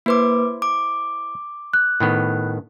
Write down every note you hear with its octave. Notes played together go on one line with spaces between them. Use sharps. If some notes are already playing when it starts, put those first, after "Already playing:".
A#3 E4 B4 C5 D6
D6
F#6
A2 D#3 B3